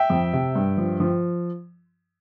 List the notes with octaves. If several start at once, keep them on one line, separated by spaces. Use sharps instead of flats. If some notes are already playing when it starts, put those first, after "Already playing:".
Already playing: E5 G5
F2
C3
G2
F3
F3